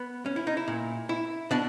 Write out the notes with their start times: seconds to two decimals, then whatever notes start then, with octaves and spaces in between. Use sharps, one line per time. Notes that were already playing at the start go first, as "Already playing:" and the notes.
Already playing: B3
0.26 C#4
0.36 E4
0.47 D#4
0.57 E4
0.68 A#2
1.09 E4
1.51 B2 D4